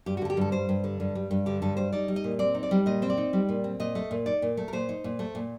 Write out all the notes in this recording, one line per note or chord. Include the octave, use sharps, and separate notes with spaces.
G2 G4
F#4
D3 A4
G4
G2 A4
G3 C5
G2
D3
G2
G3
G2
D3 G4
G2 A4
G3 C5
D#4 D5
G3
D#5
A#2
C4 D5
D#4
D5
G3
A#2 D#5
C4 C5
D5
D#4
G3
A#2
C4
A#2 D#5
A3
A#2
D#4 D5
A#2
A3
A#4
A#2 C5
D#4
A#2
A3
A#2